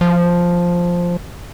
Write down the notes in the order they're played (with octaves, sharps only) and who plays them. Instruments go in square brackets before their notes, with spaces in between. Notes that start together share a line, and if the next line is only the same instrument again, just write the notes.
[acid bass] F3